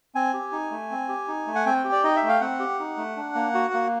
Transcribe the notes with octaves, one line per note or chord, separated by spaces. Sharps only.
C4 G#5
G4
D#4
A3
C4
G4
D#4
A3
F#5
C4 G5
G4
D5
D#4 D#5
E5
A3
F5
C4 F#5
G4
D#4
A3
D4
A#3
F#4
A#3